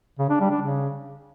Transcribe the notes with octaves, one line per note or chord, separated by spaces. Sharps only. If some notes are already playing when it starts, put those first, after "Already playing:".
C#3
D4
G3
D4
C#3